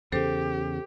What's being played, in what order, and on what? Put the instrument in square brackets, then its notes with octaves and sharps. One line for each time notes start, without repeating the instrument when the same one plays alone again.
[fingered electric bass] E2 C#3 [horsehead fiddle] G4 [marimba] A4 C5